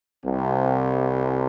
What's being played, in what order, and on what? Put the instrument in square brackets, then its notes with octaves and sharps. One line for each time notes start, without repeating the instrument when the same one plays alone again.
[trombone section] C2 C3